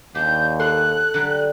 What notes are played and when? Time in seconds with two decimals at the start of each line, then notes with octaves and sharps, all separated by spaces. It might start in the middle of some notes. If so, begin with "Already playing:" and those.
0.15 D#2 D4 G4 G6
0.60 A4 C6 F#6
1.14 D3 F#3 G3